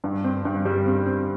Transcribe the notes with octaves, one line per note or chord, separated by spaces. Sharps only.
G2
C4
G2
G3
C4
C4